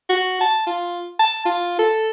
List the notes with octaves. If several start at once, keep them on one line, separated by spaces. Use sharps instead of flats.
F#4
A5
F4
A5
F4
A4